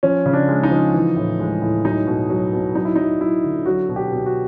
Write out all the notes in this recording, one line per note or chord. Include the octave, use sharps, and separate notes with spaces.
F3 C#4
C#3
D4
G#3
D#4
F3
E3
A2
G#3
A2
F#3 D#4
B2
F#3
B2
F#3 D#4
E4
F#3 D#4
F#3 E4
D3
F#3 F#4
B2
G4
B2
F#4